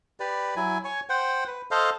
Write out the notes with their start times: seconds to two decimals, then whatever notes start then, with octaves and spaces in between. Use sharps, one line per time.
0.20 G4 B4 D5
0.56 F#3 E4 G#5
0.85 C#5 G#5 C#6
1.09 C5 F#5 G5
1.47 B4
1.71 A4 C5 D#5 F5